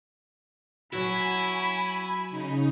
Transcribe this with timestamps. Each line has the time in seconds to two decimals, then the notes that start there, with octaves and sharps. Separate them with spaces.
0.93 F#3 E4 F#4 G#5 B5
2.30 C#3 D#4